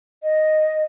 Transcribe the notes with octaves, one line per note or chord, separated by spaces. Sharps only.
D#5